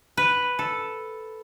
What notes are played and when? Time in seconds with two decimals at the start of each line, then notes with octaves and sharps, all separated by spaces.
0.17 B4
0.59 A4